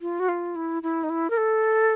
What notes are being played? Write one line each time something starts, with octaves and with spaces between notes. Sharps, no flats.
F4
F#4
F4
E4
E4
D#4
E4
A#4
A4